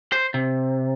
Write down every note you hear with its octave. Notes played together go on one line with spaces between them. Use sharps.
C5
C3